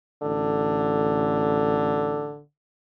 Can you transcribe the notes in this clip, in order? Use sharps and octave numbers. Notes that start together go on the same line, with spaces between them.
A1 D3